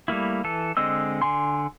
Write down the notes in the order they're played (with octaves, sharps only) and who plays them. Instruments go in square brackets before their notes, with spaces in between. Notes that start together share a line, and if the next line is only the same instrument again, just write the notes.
[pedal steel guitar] G3 A3 A#3 E4
E3 A4
D3 G#3 C4 D#5 E6
D3 G#5 C6